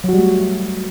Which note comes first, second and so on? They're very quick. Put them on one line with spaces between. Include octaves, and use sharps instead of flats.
F#3 F#4 G3 A3